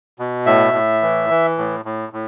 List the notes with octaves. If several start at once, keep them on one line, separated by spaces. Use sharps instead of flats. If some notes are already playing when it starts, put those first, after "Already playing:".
B2
A2 E5
A2
E3
E3
A2
A2
A2